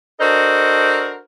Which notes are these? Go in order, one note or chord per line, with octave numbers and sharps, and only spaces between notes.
D4 F#4 A4 A#4 C5 D#5